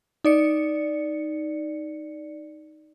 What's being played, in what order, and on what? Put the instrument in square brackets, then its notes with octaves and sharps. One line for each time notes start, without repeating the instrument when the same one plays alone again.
[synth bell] D#4 D5 C#7